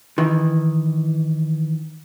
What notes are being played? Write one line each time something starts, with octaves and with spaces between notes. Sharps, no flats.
D#3 E3